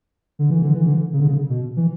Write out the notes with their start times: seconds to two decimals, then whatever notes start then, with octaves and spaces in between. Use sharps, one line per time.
0.39 D3
0.50 E3
0.62 D3
0.74 E3
0.86 D3
1.13 C#3
1.20 D3
1.27 C#3
1.49 B2
1.76 E3